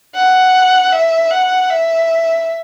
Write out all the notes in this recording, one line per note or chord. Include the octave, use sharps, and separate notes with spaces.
F#5
E5
F#5
E5